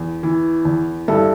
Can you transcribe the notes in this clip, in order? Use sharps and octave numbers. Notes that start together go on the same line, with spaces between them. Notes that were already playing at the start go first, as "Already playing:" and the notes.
Already playing: E2
E3
E2
G2 E4 A4